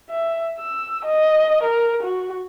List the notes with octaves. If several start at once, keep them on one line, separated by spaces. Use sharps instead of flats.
E5
E6
D#5
A#4
F#4